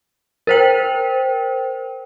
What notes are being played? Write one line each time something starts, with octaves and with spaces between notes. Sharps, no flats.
A#4 C5 G5